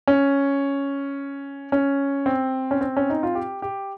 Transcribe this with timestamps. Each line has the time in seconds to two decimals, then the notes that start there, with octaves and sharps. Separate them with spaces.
0.07 C#4
1.72 C#4
2.26 C4
2.71 C#4
2.81 C4
2.97 C#4
3.10 D#4
3.23 F4
3.35 G4
3.62 G4